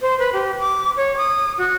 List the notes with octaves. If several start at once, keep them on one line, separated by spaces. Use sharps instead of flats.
C5
B4
G4
D6
C#5
D#6
F#4